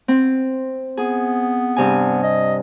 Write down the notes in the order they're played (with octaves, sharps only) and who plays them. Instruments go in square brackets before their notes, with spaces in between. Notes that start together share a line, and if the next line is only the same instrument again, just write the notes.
[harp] C4
[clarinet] B3 [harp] G#4
[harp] G2 C3 G#5
[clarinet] D#5